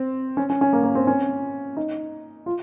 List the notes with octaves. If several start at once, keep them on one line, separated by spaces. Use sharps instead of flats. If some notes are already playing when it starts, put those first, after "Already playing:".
Already playing: C4
C#4
C#4
C#4
A#3
A#3
C4
C#4
D#4
F4